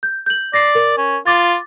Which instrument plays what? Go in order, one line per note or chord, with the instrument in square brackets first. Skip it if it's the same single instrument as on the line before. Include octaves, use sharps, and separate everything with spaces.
[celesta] G6
G6 F#7
[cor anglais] D5 [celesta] A#6 C7
[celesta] A#4
[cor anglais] C#4
[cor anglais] F4 [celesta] D6 A6